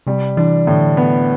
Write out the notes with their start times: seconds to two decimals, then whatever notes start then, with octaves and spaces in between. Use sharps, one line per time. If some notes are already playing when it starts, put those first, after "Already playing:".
0.07 C3 G3
0.37 E3 D4
0.67 A2 D3
0.97 B3